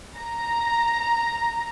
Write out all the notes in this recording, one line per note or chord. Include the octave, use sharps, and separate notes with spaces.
A#5